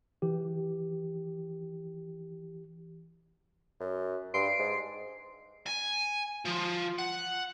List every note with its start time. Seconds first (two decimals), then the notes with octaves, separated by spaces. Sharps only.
0.22 E3 G4
3.80 F#2
4.34 G2 C6 C7 D7
4.59 G#2
5.66 G#5
6.45 F3
6.98 F#5